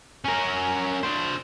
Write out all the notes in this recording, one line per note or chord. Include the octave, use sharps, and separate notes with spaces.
C#4 A#4
D4 C5